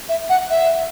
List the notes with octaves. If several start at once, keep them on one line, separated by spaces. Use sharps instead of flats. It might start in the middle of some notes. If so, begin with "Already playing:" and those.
E5
F#5
E5